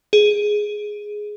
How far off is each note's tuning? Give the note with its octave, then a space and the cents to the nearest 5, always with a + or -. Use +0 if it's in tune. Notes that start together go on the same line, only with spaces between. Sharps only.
G#4 +5